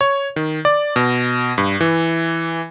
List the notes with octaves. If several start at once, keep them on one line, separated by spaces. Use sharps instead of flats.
C#5
D#3
D5
B2
G2
E3